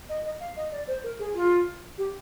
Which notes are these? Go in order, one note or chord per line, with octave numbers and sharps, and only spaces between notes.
D#5
D#5
F5
D#5
D5
C5
A#4
G#4
F4
G4